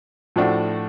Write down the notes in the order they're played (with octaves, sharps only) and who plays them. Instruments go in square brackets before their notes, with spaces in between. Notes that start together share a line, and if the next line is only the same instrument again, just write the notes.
[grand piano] A2 F3 A3 D4 F#4